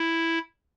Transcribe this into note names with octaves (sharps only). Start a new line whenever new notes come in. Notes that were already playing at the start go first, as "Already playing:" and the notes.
Already playing: E4